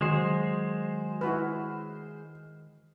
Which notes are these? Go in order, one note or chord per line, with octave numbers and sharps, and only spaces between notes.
D#3 F#3 G#3 C5
E4 F#4 B4 F6